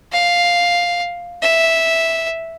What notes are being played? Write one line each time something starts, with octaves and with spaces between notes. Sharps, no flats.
F5
E5